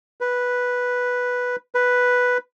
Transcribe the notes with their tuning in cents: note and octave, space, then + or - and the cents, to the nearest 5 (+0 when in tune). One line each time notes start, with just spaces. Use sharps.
B4 -5
B4 +0